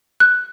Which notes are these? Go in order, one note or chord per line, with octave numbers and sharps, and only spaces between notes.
F#6